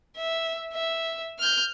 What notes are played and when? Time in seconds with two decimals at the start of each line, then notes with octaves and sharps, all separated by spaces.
0.17 E5
0.73 E5
1.39 F6 G6